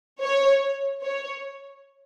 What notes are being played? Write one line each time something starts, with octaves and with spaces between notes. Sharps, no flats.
C#5
C#5